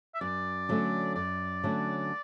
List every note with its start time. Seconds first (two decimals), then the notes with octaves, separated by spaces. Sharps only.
0.15 E5
0.21 F#2 D5
0.69 D3 F#3 A3 C#4
1.15 F#2 D5
1.64 D3 F#3 A3 C#4